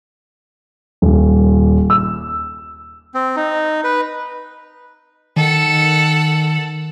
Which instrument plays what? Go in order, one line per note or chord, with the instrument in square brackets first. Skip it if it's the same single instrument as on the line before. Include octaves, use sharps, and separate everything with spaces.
[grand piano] D#1
E6
[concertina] C4
D#4
B4
[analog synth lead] D#3 [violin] A4 F#5